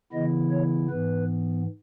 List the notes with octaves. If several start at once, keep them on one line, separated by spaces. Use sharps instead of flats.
C#3 E3 B3 E4 D#5
C#5
G#2 E3 B3 B4